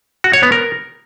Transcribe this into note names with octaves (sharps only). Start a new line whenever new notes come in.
F#4
C#5
B3
A#4